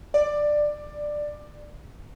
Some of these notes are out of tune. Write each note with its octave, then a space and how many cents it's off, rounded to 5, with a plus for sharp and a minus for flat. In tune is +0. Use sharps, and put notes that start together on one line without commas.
D5 +10